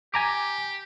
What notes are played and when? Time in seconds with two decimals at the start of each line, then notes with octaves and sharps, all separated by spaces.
0.14 G4 G#5 A#5 D6